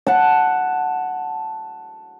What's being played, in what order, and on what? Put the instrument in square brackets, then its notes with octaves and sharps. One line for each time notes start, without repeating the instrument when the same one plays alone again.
[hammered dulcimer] F#5 A5